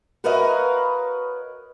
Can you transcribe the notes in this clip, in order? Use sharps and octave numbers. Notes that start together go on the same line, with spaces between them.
F#4 A#4 B4 C#5 D#5 F5